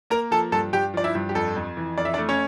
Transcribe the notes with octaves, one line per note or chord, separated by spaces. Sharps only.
A#3 A#4 A#5
F3 A4 A5
G2 A4 A5
G2 G4 G5
F3 D5
E4 E5
G2
G4
F2 A4
F2
E3
F2 D5
E5
D4 D5
A3
C#4 C#5